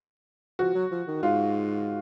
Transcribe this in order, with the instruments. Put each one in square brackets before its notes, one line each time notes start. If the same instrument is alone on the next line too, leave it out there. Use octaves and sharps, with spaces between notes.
[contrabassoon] F3 [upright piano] F#4
[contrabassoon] F#3
F3
D#3
[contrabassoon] G#2 [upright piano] F4